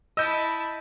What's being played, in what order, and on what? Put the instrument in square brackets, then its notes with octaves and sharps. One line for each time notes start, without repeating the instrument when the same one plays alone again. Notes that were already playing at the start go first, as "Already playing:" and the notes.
[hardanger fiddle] E4 A5 [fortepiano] D#5 [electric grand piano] E6 G6